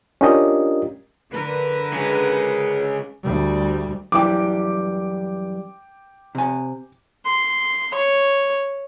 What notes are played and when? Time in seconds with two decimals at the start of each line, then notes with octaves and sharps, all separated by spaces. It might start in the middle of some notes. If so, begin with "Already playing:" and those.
0.21 C#4 D4 F4 G4 A#4 D#5
1.32 D3 A#4 B4
1.93 C#3 G#3
3.24 D2 G3
4.12 F#2 E3 G3 G5 D6
6.35 C3 G#5
7.25 C6
7.94 C#5